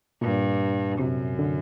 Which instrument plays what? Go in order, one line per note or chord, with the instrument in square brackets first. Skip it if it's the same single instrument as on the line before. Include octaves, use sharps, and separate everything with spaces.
[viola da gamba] G2 [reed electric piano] A#2
[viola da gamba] F#2 [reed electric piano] C3
[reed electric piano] D3